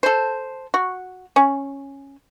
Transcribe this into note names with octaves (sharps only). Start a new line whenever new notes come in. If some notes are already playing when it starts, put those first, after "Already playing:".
A4 C5
F#4
C#4